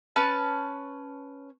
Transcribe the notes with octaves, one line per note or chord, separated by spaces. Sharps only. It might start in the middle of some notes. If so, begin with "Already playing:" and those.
C#4 B4 A5